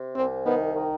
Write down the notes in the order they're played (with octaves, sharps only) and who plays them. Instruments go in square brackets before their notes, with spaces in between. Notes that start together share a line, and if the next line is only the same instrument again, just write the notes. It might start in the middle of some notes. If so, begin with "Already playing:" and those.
Already playing: [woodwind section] C3
[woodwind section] C2 [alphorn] C4
[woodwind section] D#3 [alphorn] B3
[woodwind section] D#3